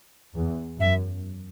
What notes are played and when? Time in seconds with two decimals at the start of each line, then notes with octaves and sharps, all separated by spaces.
0.35 E2
0.79 F#2 E5